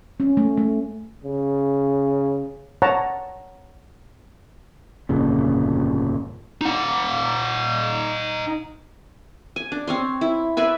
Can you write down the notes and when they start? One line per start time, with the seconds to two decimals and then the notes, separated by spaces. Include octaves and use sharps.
0.20 C#4
0.37 A3
0.57 A3
1.24 C#3
2.82 C#5 F#5 A5 A#5
5.09 G1 F2 A#2 C#3
6.61 D#4 F#5
9.56 G#5
9.72 D4
9.87 C4 C#5 C6
10.21 E4
10.57 B4 D5 E5 G#5